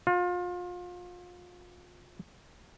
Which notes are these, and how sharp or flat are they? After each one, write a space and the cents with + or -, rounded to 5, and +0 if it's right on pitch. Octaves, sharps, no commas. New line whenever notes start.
F4 +30